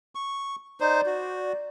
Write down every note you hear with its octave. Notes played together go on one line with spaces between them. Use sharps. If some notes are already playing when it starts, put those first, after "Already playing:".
C#6
D#4 C5 D5
F#4